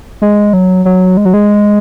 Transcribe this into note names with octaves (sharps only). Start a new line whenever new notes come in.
G#3
F#3
F#3
G#3
F#3
G#3